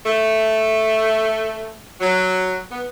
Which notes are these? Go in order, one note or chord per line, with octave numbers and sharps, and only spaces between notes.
A3
F#3
B3